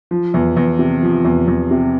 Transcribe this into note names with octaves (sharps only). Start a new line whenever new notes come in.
F3
E2
E2
C3
F3
E2
E2
C3